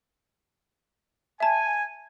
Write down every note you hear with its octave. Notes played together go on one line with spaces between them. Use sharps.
E5 G#5 A5